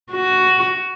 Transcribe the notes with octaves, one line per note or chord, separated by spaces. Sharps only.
F#4